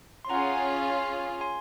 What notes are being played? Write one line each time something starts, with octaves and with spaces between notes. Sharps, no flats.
C6
C#4 F4 G#4 F#5 A#5
G#5 C6